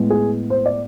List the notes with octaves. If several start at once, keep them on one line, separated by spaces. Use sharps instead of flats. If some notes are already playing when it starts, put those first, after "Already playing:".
Already playing: A2 G#3 B3
G#4
C5
D5